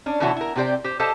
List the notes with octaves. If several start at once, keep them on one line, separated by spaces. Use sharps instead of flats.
C#4 D4
B2 D3 E3 E4 F#4 C#5
E4 A#4
C3 C4 G4 C5 D5 G5
G4 C5
G4 A4 C5 D#5 F5 A5